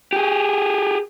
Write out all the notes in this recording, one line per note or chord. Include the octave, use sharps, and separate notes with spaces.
G4 G#4